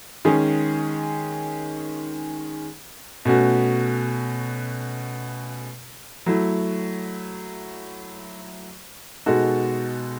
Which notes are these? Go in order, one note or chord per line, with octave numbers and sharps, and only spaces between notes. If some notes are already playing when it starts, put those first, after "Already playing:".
D#3 G#3 C#4 G#4
B2 A3 C#4 F#4
F#3 A3 E4
B2 G#3 D#4 F#4 A4